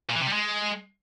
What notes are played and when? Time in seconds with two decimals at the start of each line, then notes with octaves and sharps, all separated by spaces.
0.10 A#2
0.15 E3
0.21 C3
0.27 G3
0.32 G#3